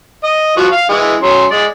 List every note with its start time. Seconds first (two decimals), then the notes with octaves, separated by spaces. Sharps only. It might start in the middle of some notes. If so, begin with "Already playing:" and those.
0.24 D#5
0.57 F3 F#4
0.72 F5
0.89 E3 G#3
1.23 F#3 C#4 C6
1.50 G#3 D5